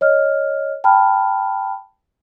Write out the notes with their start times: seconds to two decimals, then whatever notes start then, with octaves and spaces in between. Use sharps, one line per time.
0.01 C#5 D#5 F6
0.84 G5 A5 B5 F6